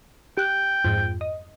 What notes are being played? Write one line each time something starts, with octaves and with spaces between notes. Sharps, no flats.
G4 G5 F#6
F2 G#2
D#5